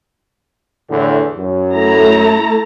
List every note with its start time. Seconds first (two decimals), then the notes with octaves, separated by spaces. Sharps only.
0.90 E2 A2 D3
1.37 F#2
1.72 A3 E4 A#5